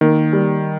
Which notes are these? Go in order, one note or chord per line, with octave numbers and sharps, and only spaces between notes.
D#3 A#3
G3